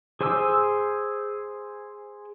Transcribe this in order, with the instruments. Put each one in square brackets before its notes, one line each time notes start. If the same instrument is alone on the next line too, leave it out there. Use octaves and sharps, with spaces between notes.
[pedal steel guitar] G#4 C5 G#5 D6 E6